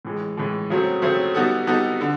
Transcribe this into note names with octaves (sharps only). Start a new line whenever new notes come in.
A2 E3 G#3
A2 E3 G#3
C#3 F#3 A3 C4
C#3 F#3 A3 C4
G3 B3 D#4 F#4 A4
G3 B3 D#4 F#4 A4
D3